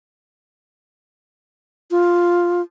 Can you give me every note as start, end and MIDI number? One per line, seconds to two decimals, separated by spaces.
1.91 2.62 65